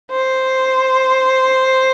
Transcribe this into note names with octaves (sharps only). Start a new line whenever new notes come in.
C5